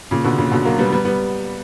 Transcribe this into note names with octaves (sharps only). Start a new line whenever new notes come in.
A#2 C#3
B2 D3
A#2 C#3
B2 D3
F#3 A#3
G3 B3
G3 B3
G3 B3